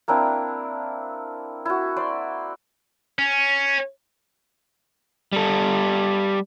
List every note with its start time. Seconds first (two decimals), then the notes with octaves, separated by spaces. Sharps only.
0.08 A#3 C4 D4 E4
1.65 E4 F#4
1.96 C5 D5 C6
3.19 C#4
5.32 G3 A4